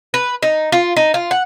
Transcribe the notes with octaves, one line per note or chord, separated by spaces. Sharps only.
B4
D#4
F4
D#4
F4
F#5